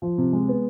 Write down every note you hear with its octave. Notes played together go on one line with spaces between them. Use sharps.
F3
C3
G#3
B3